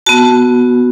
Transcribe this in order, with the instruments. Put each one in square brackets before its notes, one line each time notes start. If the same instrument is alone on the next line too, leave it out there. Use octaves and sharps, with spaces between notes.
[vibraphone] B3 F#4 A5